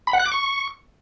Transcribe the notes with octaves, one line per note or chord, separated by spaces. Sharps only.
B5
F#5
F#6
D6
C#6